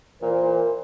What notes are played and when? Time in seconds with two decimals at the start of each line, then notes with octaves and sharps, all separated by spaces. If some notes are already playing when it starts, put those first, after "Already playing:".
0.22 A#2 E3 A#4 C5